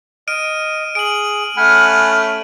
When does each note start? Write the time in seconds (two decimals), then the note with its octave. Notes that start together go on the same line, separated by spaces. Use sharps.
0.28 D#5 F6 D7 D#7
0.95 G#4 D7 F#7
1.57 A3 C#4 F#5 G#5 B5 F6